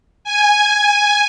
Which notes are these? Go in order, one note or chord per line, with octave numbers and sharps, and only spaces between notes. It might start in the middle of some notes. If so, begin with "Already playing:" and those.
G#5